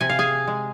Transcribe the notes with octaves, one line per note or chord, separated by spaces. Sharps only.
C3 G#5
F5
G#4 G#5
G#3